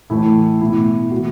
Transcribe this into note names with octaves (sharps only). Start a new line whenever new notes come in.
A2 E3 A3 E4
B2 A3 E4
E3 A3 F#4